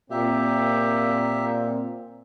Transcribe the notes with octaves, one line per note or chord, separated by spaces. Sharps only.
A#2 A#3 C4 G4 E5